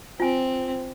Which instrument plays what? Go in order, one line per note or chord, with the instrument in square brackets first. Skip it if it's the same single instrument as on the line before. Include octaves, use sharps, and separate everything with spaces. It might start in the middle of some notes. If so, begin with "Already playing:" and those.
[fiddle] C4 [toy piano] F4 G#5